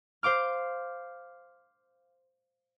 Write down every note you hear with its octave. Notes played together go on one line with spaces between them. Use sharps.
C5 F5 D6 F6